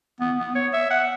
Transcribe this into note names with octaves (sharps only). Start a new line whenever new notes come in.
B3
B3
C#5
E5
F#5